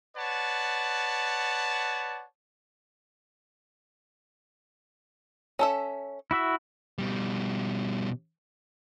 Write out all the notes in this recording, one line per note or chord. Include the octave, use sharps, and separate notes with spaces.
B4 C#5 D5 F#5 A5
C#4 A4 E5
E4 F#4 E5
B2 G3